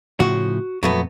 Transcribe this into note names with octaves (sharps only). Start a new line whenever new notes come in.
A2 C#3 F3 F#4
F2 A#2 F#3 A3 B3